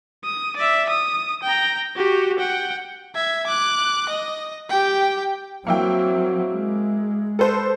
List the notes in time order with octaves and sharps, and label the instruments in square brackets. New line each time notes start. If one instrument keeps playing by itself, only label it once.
[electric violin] D#6
D5 E5
D#6
G5 A#5
F#4 G4
F#5 G5
E5 G#6
D6 F#6
D#5
G4 G5
[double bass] F#3 C4 [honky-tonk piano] A#3 E4 G5
[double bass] G#3
[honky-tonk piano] A4 B4 C5